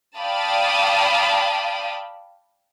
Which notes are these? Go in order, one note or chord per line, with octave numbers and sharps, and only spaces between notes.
D5 F5 G5 A5 B5 D#6